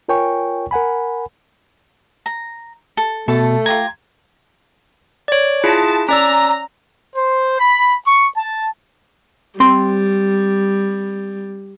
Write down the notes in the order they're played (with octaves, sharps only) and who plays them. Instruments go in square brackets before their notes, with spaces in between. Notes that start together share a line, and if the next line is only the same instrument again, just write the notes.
[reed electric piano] F4 A#4 C#5 G5 G#5 C#6
A#4 F#5 G#5 B5
[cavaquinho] A#5
A4
[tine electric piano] B2 [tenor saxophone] A3 [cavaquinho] A4 A5
[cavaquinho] F4 G4 A#5 [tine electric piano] G#6
[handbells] C#5 D5
[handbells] E4 F4 G#4 [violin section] A5
[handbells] C#4 D5 E6 [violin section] A#5
[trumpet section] C5
B5
C#6
A5
[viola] G3 [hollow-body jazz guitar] C4 C6